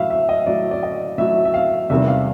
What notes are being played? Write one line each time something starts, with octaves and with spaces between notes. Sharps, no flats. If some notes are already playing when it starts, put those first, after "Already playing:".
Already playing: A2 F#3 E5 F5
E5
D#5
A2 F#3 D5
D5
D#5
A2 F#3 E5
E5
F5
E2 C3 D#3 G3 E5
F5